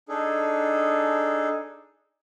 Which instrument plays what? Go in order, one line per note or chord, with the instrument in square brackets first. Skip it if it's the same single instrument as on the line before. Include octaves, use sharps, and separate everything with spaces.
[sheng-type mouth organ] D4 D#4 G#4 A4